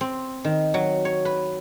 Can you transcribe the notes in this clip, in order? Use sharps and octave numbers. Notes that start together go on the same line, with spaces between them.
C4
D#3
F#3
C#5
B4